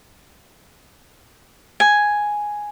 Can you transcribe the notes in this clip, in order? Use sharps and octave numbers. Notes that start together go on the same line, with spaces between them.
G#5